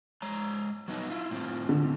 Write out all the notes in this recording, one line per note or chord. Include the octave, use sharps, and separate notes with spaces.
G#3 C#5 A#5
F#3 B3 D#4
E4 F4
A2 C4 F4
D3